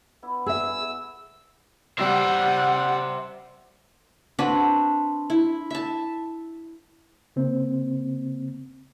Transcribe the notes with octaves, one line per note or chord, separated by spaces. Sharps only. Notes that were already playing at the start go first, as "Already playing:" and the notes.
B3 E4 D5
G#4 E5 E6
G3 C5 E5 F#5
C4 D4 F#4 B4
E4
E5 A5
C#3 A#3 C4